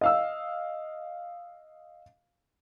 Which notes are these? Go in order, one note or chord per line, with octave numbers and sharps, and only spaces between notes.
D#5 F5 E6